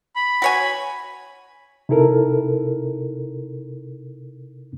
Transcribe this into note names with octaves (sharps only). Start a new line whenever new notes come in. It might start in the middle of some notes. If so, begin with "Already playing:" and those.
B5
F#4 C#5 G#5
C3 D#4 E4 A4 A#4